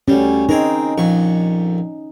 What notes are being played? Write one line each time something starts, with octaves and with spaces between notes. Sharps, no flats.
D2 G3 C#4
C4 D#4 G#4 A#4
A#1 F2 C#6